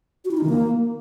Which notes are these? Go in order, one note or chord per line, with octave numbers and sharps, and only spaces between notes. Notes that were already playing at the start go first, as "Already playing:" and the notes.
F#4
E4
D#4
D#3
A#3